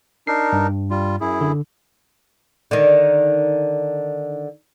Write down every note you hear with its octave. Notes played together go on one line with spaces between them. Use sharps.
D4 D#4 A#4 C7
G2
G3 F4
F#2 E4 G#4
D3
D3 D#3